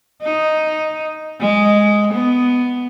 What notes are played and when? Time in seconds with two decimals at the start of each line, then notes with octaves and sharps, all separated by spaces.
0.23 D#4
1.40 G#3
2.13 B3